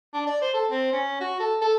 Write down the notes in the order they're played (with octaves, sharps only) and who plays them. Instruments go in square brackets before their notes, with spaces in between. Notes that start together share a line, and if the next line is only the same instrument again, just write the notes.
[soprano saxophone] D4
D5
C5
A4
C4
C#4
F#4
A4
A4